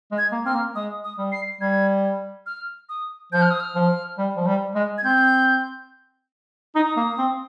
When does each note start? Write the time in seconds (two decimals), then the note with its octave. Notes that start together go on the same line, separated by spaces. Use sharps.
0.11 G#3
0.18 G#6
0.32 A#3
0.45 C4 F6
0.54 A#3
0.75 G#3 D#6
1.04 D#6
1.18 G3
1.32 C7
1.61 G3 G#6
2.46 F6
2.89 D#6
3.32 F3 G6
3.42 F6
3.51 D#6
3.60 F6
3.75 F3
4.18 G3
4.37 F3
4.47 G3
4.75 G#3
4.98 G#6
5.04 C4 G6
6.75 D#4 D#6
6.96 A#3
7.18 C4